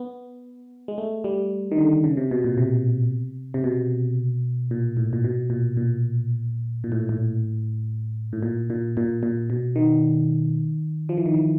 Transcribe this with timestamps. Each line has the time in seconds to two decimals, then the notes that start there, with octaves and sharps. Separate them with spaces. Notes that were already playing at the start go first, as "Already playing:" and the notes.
Already playing: B3
0.88 G#3
0.98 A3
1.24 G3
1.72 D#3
1.78 D3
2.04 C#3
2.17 C3
2.31 B2
2.44 A#2
2.58 C3
3.54 C3
3.64 B2
4.71 A#2
4.97 A2
5.13 A#2
5.24 B2
5.50 A#2
5.77 A#2
6.84 A#2
6.92 A2
7.09 A2
8.33 A2
8.43 A#2
8.70 A#2
8.97 A#2
9.23 A#2
9.50 B2
9.76 D#3
11.09 F3
11.17 E3
11.26 D#3
11.34 E3